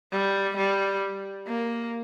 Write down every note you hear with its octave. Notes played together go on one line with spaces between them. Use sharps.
G3
G3
A#3